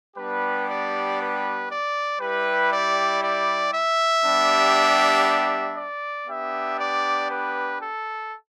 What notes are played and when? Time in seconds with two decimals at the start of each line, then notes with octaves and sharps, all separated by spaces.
0.16 G3 B3 D4 G4 B4
0.67 D5
1.18 B4
1.69 D5
2.20 G3 E4 G4 B4
2.71 D5
3.22 D5
3.73 E5
4.24 G3 B3 D4 G4
5.76 D5
6.27 B3 D4 G4 E5
6.78 D5
7.29 B4
7.80 A4